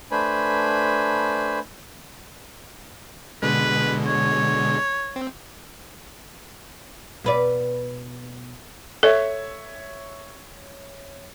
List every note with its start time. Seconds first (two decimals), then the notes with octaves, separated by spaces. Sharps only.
0.11 A3 D4 B4 C5 G#5 B5
3.42 B2 D3 G#3 B4
4.06 C#5
5.16 C4
7.24 B2 B4 D5
9.03 A4 C#5 E5